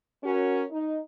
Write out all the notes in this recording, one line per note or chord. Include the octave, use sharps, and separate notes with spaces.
C#4 F#4 A#4
D#4